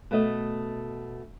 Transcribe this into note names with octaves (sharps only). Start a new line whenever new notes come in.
B2 A3 D#5